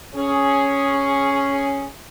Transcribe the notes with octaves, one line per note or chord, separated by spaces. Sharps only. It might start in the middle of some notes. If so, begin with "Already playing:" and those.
C#4 G#4